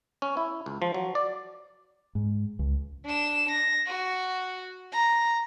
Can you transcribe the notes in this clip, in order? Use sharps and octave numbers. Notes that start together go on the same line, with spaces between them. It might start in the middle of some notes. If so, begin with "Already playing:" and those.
C#4
E4
C#2
F3
F#3
D5
G#2
C#2
D4 E7
A#6
F#4
A#5